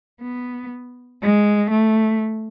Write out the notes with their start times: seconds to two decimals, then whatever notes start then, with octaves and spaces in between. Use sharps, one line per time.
0.22 B3
1.22 G#3
1.71 A3